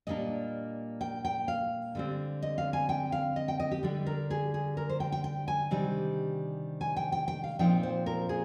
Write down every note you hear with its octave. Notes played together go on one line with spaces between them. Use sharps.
A#2 G3 A#3 D4 D#5
G5
G5
F5
D3 G3 C4
D#5
F5
G#5
G5
F5
D#5
G5
D#5
G4
D3 G3 D4
A#4
G#4
G#4
A#4
C5
G5
G5
G5
G#5
C3 D#3 G3 D4
G#5
G5
G5
G5
F5
A#2 F3 C4 D#4 G5
C5
A#4
G#4